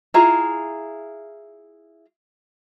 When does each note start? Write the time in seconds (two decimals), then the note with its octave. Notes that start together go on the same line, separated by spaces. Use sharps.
0.14 E4 F4 G#4 A#5